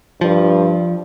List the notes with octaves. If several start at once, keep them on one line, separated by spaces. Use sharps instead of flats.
G2 F3